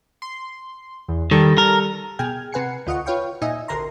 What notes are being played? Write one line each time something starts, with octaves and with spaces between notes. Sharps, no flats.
C6
E2
D#3 G3 A4
A#4
B2 G#4 G5 F6 G#6
C3 B4 F#5 G#5 C7 C#7
D2 F4 D#5 F#5 C#6
F4 B4 C#5 F5 G5 C#6
A#2 D#4 D#5 E5 G#5
A1 D2 A#4 A#5 C6